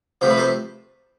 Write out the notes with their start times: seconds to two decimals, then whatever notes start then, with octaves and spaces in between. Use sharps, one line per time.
0.21 C3 F3 A3 C5
0.30 B4
0.37 A4 C5